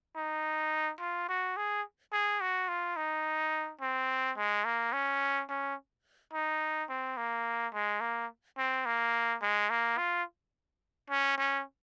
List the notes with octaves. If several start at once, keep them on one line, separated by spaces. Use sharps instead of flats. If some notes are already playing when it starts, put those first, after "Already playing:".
D#4
F4
F#4
G#4
G#4
F#4
F4
D#4
C4
G#3
A#3
C#4
C#4
D#4
C4
A#3
G#3
A#3
C4
A#3
G#3
A#3
F4
C#4
C#4